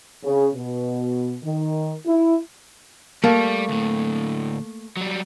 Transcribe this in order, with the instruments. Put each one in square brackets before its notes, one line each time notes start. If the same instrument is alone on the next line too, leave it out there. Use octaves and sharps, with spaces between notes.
[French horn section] C#3
B2
D#3
E4
[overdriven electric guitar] G3 [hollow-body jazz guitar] A3 A#3
[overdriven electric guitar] D2 A2
F#3 G3